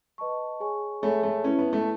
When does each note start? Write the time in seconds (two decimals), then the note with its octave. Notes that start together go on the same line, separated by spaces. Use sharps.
0.18 B4 D#5 A5 C#6
0.60 G#4 C#5 G#5 C#6
1.02 A3 G#4 C#5 E5 G#5 B5
1.23 A3
1.44 C#4 E4 B4 E5 A5
1.59 B3
1.73 A3